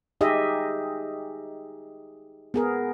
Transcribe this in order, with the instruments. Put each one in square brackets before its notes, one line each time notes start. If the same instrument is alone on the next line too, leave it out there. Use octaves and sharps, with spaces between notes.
[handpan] D#4 G4 G#4 D#5 E5
B3 G#4 A#4